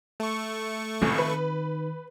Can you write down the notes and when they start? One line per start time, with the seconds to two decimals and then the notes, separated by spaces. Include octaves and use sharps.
0.20 A3 C#6
1.02 F1 C#2 A2 D#3
1.18 B4